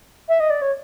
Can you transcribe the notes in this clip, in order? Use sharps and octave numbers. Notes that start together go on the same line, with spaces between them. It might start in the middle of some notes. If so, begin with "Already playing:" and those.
E5
D#5
D5
C#5